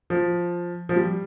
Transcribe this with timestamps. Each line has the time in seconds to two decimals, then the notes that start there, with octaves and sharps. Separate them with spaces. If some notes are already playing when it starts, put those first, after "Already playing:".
0.10 F3
0.89 F3
0.96 G3